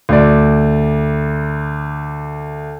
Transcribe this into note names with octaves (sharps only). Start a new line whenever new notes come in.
D2 D5